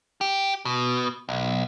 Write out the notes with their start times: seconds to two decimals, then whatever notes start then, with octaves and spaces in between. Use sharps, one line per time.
0.21 G4
0.65 B2
1.29 B1